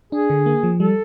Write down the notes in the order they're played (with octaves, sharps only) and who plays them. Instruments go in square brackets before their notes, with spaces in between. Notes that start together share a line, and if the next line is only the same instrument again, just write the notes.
[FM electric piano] D4 [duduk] G#4
[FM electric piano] D3
A#3
F3
[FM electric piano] G3 [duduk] A4